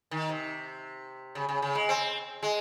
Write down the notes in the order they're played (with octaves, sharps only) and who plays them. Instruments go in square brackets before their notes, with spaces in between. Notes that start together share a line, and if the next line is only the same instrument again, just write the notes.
[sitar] D#3
C3
C#3
C#3
C#3
G#3
C4
G#3